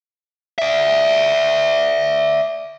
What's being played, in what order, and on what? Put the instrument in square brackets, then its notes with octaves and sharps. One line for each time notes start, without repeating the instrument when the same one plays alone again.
[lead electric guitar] D5 E5